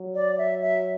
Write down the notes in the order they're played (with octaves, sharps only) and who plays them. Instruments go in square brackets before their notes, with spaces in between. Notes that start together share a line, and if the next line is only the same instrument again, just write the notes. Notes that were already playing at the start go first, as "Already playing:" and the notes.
Already playing: [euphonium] F#3
[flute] D5
E5
E5